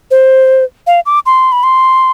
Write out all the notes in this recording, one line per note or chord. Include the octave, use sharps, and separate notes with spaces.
C5
F5
D6
C6
B5
C6